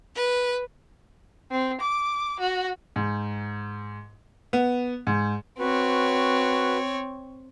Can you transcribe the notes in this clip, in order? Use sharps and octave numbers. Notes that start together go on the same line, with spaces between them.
B4
C4
D6
F#4
G#2
B3
G#2
C4 F#4 B4 C#5